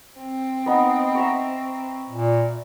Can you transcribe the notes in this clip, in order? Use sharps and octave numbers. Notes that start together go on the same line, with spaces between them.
C4
B3 D#4
E5 A#5 C#6
A#2